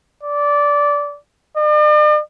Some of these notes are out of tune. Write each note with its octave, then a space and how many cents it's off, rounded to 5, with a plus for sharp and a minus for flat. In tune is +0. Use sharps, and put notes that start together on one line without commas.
D5 -15
D5 +45